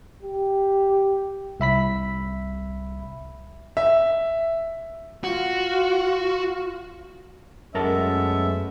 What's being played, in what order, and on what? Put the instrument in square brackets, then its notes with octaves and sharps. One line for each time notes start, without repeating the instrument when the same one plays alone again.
[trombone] G4
[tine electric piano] C2 E5 B5 B6
[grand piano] E5
[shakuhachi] F4 [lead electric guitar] F#4
[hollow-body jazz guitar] F#2 A#4 A5 [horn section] G#3 A3 B3 [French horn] C#4 [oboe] E5